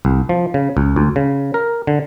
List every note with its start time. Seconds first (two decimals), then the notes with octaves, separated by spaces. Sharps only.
0.05 C2
0.29 F3
0.54 C#3
0.77 C#2
0.96 D2
1.16 C#3
1.54 A#4
1.87 D3